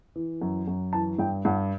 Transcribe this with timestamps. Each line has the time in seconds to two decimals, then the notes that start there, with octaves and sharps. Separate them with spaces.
0.16 E3
0.42 F#2
0.68 F#2
0.93 E3 A5
1.19 G2 G5
1.45 G2 F#5